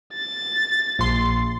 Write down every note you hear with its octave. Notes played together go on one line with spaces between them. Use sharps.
A6
A#1 C6